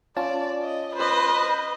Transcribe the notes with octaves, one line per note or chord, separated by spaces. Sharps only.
C#4 F4 D5 A5
D#5
B4 C5 D#5